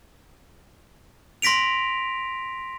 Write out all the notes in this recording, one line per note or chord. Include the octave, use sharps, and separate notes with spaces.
C6 A#6 B6 D7 F7